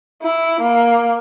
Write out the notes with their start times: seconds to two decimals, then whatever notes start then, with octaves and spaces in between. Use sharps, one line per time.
0.22 E4
0.61 A#3